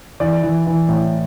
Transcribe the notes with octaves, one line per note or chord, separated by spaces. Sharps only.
E3 D5
E3
E3
A2